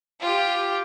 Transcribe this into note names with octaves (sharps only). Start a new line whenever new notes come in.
F4 G4